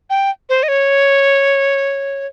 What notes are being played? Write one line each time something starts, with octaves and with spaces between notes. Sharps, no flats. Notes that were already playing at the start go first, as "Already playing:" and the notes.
G5
C5
D#5
C#5